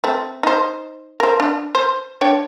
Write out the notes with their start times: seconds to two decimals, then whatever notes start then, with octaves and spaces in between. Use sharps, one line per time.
0.04 A3 C4
0.43 D#4 C5
1.20 A#4 C5
1.40 D4
1.75 C5
2.21 D4 C#5 G5